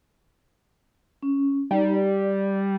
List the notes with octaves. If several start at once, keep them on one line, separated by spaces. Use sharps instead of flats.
C#4
G3 D#4 A#5
D5